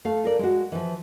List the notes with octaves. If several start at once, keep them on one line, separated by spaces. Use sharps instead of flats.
A3 F5
F4 A#4 D5
G#3 F#4
E3 F3